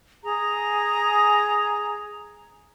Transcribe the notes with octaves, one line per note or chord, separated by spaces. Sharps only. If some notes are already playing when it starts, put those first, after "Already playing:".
G#4 A#5